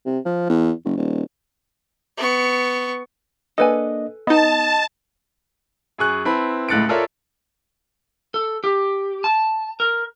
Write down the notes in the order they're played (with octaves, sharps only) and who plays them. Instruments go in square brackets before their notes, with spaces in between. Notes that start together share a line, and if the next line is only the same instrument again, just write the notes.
[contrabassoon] C3
F3
E2
F#1
D#1
[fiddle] B3 C#6
[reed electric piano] A#3 D4 D#5 [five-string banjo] A4 B4 G#5
[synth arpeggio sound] B3 D#4 [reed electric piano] D#5 [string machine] A5
[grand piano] F#2 G#4 C#6 F#6
C4 E4 B4 A5 B5
C#2 A2 F#6 A6 C#7 D7
F4 A4 A#4 C#5 D5 E5
[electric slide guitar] A4
G4
A5
A#4